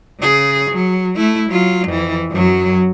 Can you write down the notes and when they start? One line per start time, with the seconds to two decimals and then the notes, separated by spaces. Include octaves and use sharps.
0.20 C#3 G#4
0.70 F#3
1.16 A3 E4
1.50 F#3 F4
1.88 F2 E3
2.30 F#2 F#3